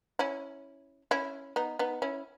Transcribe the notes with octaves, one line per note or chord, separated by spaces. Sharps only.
C#4 E4
C#4 E4
B3 D#4
B3 D#4
C#4 E4